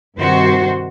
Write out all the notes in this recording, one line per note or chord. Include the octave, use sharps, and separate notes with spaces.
G2 C3 D#3 F#4 C5